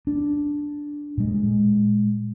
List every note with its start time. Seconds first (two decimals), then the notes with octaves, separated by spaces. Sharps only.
0.07 D4
1.17 A#2 G#3